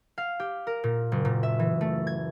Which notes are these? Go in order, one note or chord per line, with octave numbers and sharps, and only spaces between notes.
F5
G4
A#4
A#2
F#1
A#2
E5
E3
A3
G#6